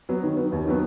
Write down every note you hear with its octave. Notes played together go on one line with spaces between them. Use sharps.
F#3 B3
D#3
F#3 B3
D#2
D#3 F#3 B3